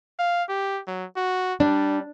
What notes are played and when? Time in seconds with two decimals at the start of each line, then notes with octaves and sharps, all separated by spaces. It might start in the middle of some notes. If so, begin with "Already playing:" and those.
0.19 F5
0.49 G4
0.87 F#3
1.17 F#4
1.60 G3 D4